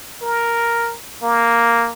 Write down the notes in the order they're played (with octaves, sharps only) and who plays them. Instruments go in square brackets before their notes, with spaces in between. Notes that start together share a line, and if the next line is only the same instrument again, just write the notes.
[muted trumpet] A#4
A#3